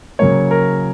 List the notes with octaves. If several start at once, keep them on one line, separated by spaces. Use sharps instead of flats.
C#3 F#3 A#3 C#5
A#4